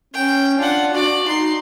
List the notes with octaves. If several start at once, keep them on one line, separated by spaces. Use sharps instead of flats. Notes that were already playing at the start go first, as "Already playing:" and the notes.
C#4 G5
D4 F4 F#5
F#4 D5
D#4 C6